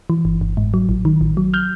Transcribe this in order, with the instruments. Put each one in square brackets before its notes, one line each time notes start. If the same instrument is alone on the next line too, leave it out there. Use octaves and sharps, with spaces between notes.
[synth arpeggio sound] E3
G1
G1
G#2
F#3
A1
D#3
A1
F#3
F6 G6